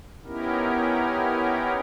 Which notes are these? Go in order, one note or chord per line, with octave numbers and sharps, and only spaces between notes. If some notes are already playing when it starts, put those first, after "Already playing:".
B3 C#4 D#4 E4 G4 A#4